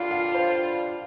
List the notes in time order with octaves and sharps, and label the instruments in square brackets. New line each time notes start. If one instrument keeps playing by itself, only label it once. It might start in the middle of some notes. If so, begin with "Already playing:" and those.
Already playing: [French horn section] D3 G3 D4 F4 [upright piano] F5
[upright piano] F5
C5